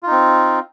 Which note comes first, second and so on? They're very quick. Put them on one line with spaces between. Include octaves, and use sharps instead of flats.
F4 D#4 C4